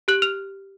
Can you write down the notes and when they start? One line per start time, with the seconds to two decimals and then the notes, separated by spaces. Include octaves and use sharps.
0.08 G4 F#6 F#7
0.22 F6 F7